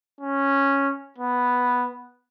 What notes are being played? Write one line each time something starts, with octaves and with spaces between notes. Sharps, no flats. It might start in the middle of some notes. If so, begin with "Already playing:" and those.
C#4
B3